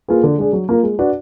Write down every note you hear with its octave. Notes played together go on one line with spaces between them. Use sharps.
A#3 F4 G#4 B4
D3
G#3 D4 G#4
F#3
A#3 F4 A#4
G#3
D4 F#4 B4